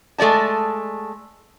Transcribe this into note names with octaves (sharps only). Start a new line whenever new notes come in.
G#3 A3 F#4 D5 A5